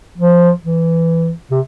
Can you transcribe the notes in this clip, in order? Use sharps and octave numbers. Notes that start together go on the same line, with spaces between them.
F3
E3
C3